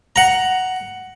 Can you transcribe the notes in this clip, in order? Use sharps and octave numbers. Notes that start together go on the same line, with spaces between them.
F#5 A#5